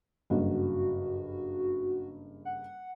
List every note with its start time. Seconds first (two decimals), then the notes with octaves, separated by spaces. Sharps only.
0.30 F#1 G2 F#4
2.45 F#5